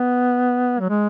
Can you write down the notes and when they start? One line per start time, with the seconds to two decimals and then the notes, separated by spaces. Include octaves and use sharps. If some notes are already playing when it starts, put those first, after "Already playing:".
Already playing: B3
0.80 F#3
0.89 G#3